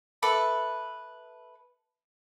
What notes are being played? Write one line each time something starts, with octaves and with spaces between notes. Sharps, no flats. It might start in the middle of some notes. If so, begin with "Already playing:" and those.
A4 B4 E5 D6